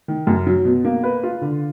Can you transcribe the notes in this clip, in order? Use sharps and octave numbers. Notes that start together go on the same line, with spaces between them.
D#3
F#2
F#3
B2
A#3
B4
F4
D3